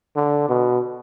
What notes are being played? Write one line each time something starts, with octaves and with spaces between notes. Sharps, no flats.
D3
B2